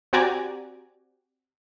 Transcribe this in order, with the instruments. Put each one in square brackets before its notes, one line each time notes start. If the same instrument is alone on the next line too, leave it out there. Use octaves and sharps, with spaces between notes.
[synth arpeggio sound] C4 F#4 G4 D5 G#5 A#5